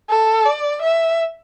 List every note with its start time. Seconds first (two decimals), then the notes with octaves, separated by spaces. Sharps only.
0.10 A4
0.46 D5
0.82 E5